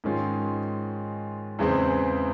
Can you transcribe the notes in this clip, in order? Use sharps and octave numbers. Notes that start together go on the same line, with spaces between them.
G#2 D#3 G#3 C#4 F4
E2 C#3 E3 G#3 C4